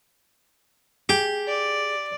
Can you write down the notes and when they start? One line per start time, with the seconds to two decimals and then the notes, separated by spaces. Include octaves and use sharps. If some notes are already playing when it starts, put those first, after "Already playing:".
1.09 G4 G#4
1.48 D5